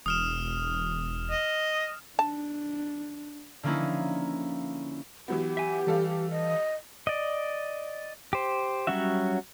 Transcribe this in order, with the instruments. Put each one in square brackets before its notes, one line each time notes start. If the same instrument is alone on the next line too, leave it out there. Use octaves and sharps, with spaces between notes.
[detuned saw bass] E1 [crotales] D#6 F6 E7
[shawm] D#5
[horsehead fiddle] D4 [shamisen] A5
[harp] D3 F3 A#3 C#4 D#4 E4
[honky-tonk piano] E3 F#3 B3 [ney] G4
[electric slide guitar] E5 G#5
[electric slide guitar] E3 [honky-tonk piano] G3 A4 F5
[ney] D#5
[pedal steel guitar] D5 D#5
G4 C5
F#3 G3 C#4 F#4 E5